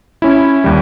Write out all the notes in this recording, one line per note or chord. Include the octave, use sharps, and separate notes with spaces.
C#4 E4
D#2 G3